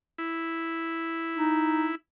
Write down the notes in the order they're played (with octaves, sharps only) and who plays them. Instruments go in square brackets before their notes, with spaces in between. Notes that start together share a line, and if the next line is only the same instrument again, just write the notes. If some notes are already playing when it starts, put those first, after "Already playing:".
[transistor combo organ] E4
[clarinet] D#4